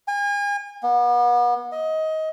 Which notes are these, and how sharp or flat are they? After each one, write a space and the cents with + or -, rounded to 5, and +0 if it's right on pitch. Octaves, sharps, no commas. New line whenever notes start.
G#5 -35
B3 -35
D#5 +20